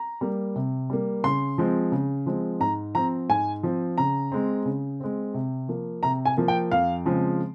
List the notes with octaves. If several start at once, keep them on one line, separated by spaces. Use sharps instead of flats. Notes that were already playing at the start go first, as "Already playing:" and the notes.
Already playing: A#5
G3 A#3
C3
G3 A#3
C#3 C6
F3 G#3 C4
C#3
F3 G#3 C4
G#2 A#5
F3 C4 A#5
G#2 G#5
F3 C4
C#3 A#5
G#3 C4
C#3
G#3 C4
C3
F3 A#3
C3 A#5
G#5
F3 A#3
G5
F2 F5
C#3 F3 G#3 C4